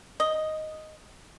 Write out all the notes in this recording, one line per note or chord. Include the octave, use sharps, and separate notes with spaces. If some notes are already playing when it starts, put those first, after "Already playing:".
D#5